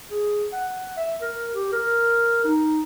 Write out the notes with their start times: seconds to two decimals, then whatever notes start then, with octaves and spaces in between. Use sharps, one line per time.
0.10 G#4
0.52 F#5
0.97 E5
1.21 A#4
1.54 G4
1.72 A#4
2.44 D#4